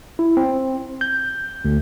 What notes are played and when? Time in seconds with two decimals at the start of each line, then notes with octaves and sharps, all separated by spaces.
0.19 E4
0.37 C4
1.01 G6
1.65 D2